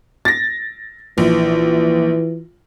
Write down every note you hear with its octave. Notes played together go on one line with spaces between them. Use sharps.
A6 A#6
A#1 E3